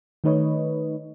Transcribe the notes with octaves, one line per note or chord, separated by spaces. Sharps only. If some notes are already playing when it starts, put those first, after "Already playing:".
D#3 A3 D#4 B4 C#5 D#5